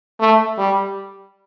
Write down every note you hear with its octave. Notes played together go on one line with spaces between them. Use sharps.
A3
G3